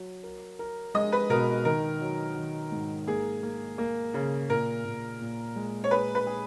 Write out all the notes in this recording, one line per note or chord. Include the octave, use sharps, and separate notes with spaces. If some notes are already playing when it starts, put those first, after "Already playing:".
Already playing: F#3
A#4
A#4
G#3 D#5
B4
B2 A#4
D#3 A#4
F#3
D#3
G#2
A#3 G#4
A#3
A#3
C#3
A#2 A#4
A#2
A#2
G#3
C#5
G#4 B4
B4
G#4